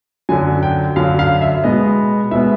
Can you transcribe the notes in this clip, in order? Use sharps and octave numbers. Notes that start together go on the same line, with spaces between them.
F#2 D3 F#3 G#5
G5
F#2 D3 F#3 F5
F5
E5
B2 G#3 B3 D#5
B2 G#3 B3 E5